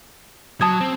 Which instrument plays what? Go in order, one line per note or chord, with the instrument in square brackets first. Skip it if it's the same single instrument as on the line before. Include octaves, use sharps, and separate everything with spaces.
[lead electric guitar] F#3 [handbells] A5 D#6 G#6
[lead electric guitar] C4